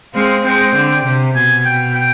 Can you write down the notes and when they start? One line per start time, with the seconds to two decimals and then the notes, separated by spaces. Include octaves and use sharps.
0.15 G#3 C4 F5
0.45 G#3 C4 G5
0.75 D3
1.05 C3
1.35 B2 G#5
1.66 G5
1.95 G5